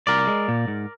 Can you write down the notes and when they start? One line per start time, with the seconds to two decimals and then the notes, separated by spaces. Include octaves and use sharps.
0.07 C2 A#4 D5
0.27 G#3
0.48 A#2
0.68 G#2